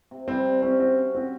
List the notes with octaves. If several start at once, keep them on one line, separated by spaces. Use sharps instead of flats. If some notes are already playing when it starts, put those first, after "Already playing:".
C3
G3 C4
C3
C4 C#4
C4 F#4
C#4
C4 F#4